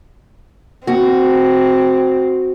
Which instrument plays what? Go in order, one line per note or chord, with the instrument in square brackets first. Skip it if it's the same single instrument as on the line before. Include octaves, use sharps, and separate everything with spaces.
[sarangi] C4 [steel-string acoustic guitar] F#4